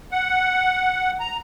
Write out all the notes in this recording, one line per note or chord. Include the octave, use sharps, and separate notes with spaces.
F#5
A#5